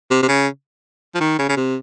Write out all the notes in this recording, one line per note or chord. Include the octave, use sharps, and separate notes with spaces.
C3
C3
C#3
F3
D#3
C#3
C#3
C3